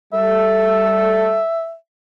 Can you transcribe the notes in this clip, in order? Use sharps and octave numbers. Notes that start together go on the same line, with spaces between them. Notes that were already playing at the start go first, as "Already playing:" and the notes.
G3 A4 E5